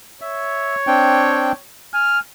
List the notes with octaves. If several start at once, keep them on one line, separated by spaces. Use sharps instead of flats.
C#5 E5
C4 D4 G5
G#5 F6